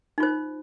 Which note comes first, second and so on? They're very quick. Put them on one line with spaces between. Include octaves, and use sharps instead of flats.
D#4 F4 C5